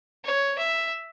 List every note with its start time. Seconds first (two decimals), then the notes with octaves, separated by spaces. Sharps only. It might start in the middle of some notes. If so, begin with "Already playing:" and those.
0.25 C#5
0.59 E5